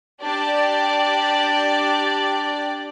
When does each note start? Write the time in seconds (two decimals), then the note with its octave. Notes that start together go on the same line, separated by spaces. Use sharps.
0.23 D4 G4 D5